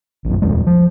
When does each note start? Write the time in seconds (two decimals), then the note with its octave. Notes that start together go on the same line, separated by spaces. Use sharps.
0.25 A#1 F#2
0.42 D#1 A#1 F2 G#3
0.67 F3